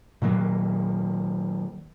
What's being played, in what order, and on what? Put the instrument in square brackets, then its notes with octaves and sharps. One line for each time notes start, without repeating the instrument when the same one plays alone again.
[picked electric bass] A#2 D#3 F#3 A#3